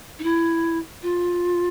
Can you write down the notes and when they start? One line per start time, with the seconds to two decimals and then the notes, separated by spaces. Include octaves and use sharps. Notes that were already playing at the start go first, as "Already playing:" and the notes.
0.19 D#4
0.23 E4
1.03 F4